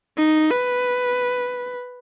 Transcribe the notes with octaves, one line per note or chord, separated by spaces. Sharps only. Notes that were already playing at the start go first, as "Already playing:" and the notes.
D#4
B4